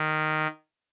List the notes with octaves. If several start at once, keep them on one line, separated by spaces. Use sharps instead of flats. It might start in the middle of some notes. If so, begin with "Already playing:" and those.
Already playing: D#3